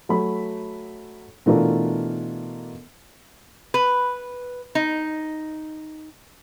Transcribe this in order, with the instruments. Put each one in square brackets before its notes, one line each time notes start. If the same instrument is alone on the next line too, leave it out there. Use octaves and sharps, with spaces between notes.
[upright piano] F#3 A3 B5
B2 E3 A3 D4 F4 A#4
[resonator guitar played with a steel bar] B4
D#4